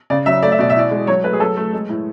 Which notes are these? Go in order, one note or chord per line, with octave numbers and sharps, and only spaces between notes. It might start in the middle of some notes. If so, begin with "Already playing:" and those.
C#3 D5
F#3 E5
A3 D5
E5
B2 D5
E5
E3 D5
G#3
F#3 C#5
A3 B4
G#4
F#3 A4
A3
G#3
A2